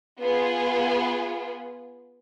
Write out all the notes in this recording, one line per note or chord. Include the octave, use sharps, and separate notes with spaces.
B3 F4 G#4